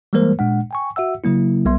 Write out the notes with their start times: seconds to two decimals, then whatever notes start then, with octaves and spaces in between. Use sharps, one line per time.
0.13 E3 G3 G#3 A#3 A#4 C5
0.39 A#2 G#3 D4 F#5
0.71 G5 G#5 C#6
0.96 F#4 E5 F#5 E6
1.24 C#3 F#3 A#3 E4
1.65 B1 G3 B3 E5 C6